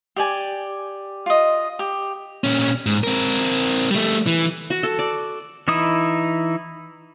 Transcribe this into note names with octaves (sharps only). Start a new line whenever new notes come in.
G4 D5 G#5
F4 D#5
G4
A#2 C#4
G#2
C4 A#4
G3 A3
E3
F#4
A4
D5
E3 D#4 E4 D#6